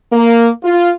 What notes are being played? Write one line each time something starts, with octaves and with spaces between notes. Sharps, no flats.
A#3
F4